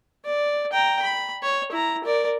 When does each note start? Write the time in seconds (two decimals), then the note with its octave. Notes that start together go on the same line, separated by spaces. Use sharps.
0.25 D5
0.73 G5 A#5
1.02 B5
1.42 C#5
1.72 E4 A#5
2.04 A#4 D5